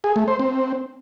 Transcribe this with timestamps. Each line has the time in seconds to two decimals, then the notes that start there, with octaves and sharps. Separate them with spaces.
0.04 G#4
0.16 A3
0.28 C5
0.39 C4